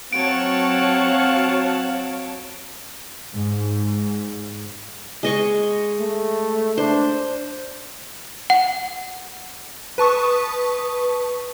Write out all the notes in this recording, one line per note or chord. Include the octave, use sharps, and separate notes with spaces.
F#3 C4 C#5 F5 F#5 A5 D7
G#2
G#3 D#5 C#6
A3
D4 C5
F#5
B4 A5 C#6 D#6